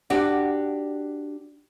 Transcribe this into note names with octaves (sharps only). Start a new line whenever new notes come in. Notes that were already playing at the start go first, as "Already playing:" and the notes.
D4 F#4 G4